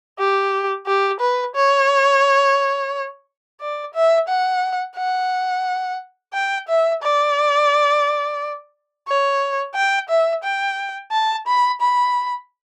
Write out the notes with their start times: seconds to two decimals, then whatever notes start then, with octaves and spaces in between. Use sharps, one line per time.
0.19 G4
0.87 G4
1.21 B4
1.55 C#5
3.61 D5
3.94 E5
4.28 F#5
4.97 F#5
6.34 G5
6.69 E5
7.03 D5
9.08 C#5
9.75 G5
10.09 E5
10.44 G5
11.12 A5
11.47 B5
11.81 B5